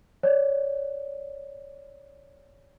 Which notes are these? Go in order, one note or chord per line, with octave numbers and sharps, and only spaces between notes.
C#5 D5